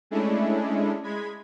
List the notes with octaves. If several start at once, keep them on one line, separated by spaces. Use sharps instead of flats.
G#3 A3 C#4 D4 E4
G#3 B5 G#6